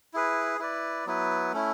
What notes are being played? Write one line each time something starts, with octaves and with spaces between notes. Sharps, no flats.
E4 G#4 B4
E4 B4 D5
F#3 B3 E4 B4
A3 C#4 E4